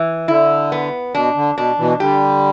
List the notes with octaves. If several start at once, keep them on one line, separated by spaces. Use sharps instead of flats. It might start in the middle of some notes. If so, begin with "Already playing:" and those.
Already playing: E3
D3 E4
B3
B2 D4
D3
B2 D4
B2 E3
D3 G3 G4